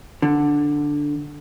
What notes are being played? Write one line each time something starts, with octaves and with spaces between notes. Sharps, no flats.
D3